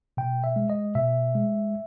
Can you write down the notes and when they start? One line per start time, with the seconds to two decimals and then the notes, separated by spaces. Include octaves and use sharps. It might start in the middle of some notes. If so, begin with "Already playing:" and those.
0.17 B2 G5
0.44 E5
0.56 G#3
0.70 D#5
0.95 B2 E5
1.35 G#3